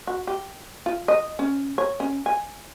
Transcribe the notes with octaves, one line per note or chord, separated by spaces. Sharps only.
F#4
G4
F4
D#5
C#4
C#5
C#4
G#5